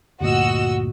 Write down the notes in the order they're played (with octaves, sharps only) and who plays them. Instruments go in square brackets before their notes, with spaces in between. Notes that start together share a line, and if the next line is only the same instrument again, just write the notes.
[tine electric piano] D2 G2 A#2 [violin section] F#4 D#5 E6